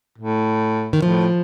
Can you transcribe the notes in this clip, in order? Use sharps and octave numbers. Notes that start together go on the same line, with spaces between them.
A2
D#3
A2 F3